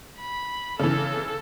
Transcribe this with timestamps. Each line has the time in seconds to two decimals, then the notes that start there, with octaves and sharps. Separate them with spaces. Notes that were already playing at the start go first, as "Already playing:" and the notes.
0.19 B5
0.80 C#3 E3 A4